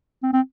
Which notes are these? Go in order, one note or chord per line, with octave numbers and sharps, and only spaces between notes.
C4
C4